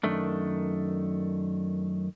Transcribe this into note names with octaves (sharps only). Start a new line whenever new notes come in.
F#2 D#3 A3 D4